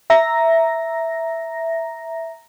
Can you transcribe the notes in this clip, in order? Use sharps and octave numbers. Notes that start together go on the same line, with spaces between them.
E5 A#5 A#6